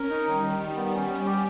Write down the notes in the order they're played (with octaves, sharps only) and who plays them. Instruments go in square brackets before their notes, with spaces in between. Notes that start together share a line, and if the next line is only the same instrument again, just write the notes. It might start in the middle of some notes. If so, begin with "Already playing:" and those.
Already playing: [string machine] C#4 [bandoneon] A#4
[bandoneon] D#4
[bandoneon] D#3 [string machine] G3
[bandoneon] D#3
D#3
B3
C#4
C#4
G4